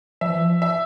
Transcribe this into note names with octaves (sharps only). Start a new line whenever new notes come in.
F3 E5
E3
F3
E5